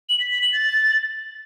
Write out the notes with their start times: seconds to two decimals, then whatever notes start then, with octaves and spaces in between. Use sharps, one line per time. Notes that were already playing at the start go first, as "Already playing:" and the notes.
0.09 F#7
0.20 B6
0.31 B6
0.42 F#7
0.53 A6